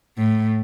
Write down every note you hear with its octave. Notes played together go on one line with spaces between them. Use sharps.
A2